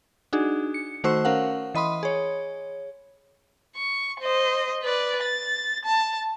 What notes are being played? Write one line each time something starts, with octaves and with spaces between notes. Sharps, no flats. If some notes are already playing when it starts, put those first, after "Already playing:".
D4 D#4 F#4 G#4
C#7
D#3 A3 F#4 C5 C#6 E6
C#4 A#4 F5 F#5
E3 D#5 B5 C6 D#6
G#4 C#5
C#6
C5 D#5
B4 D5
A6
A5